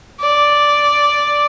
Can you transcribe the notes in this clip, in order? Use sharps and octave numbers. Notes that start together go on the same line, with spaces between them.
D5